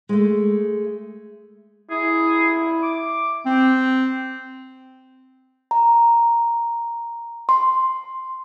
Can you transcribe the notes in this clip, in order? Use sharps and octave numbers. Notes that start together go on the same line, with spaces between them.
G#3 A3
E4 G#4
D6
C4
A#5
C6